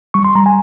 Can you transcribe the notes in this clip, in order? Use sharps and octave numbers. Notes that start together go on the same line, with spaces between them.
G3 C#6
C6
G3 A#5
G#5